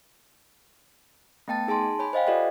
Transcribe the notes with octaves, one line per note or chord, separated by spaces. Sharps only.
A3 B3 G5 A5 A6
D#4 G#4 G#5 A5 C6
C#5 G#5 B5
C5 D#5 F5 G5
F4 G4 A4 D5 D#5 F#5